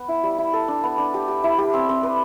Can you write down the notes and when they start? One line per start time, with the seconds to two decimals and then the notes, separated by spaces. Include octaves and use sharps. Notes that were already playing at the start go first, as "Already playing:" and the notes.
Already playing: B3
0.08 E4
0.23 G3
0.38 E4
0.53 A4
0.68 D4
0.84 B3
0.98 D4
1.14 G4
1.28 G4
1.44 E4
1.59 G4
1.74 C4
1.89 C4
2.03 B4